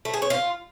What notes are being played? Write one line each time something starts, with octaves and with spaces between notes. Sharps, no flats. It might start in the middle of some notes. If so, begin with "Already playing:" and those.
A3
G#4
C#5
F4